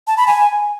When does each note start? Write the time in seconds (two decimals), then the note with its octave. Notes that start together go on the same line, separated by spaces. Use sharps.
0.07 A5
0.17 B5
0.27 G#5